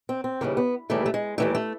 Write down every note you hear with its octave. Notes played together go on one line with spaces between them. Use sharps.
C4
C4
D#2 C#3 E3 G3 A#3
B3
D#2 C#3 E3 G3 A3
A3
G#3
D#2 C#3 E3 G3 A3
A3